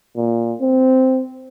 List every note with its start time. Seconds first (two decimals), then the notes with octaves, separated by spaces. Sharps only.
0.17 A#2
0.61 C4